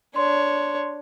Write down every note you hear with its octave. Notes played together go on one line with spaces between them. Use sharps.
D4 C#5 C6